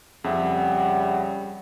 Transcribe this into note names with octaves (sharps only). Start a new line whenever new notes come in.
F2 C#3 G3 E5 F#5